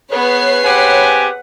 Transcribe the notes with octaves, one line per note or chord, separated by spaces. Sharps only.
B3 G#4 B4 C#5 B5 C7
C4 G4 F#5 G#5